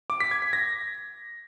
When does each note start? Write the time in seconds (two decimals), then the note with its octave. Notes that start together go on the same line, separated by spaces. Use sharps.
0.10 D6
0.20 B6
0.31 G#6
0.42 B6
0.53 A#6